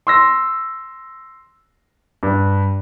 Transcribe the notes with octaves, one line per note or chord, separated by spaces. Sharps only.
C6 E6 A#6
G2